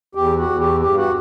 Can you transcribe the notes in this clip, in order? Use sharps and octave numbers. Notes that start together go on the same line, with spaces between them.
E2 G4
F#4
E2
G4
G2 G4
F#4